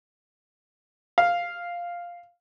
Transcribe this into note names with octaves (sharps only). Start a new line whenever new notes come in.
F5